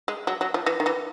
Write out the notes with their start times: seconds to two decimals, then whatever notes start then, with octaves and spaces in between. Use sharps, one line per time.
0.08 G#3
0.27 F#3
0.41 F#3
0.54 F3
0.66 E3
0.80 D#3
0.86 E3